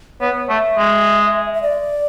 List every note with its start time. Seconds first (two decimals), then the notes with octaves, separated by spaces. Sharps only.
0.21 B3 C#5
0.49 A3 E5
0.78 G#3
1.53 E5
1.62 D5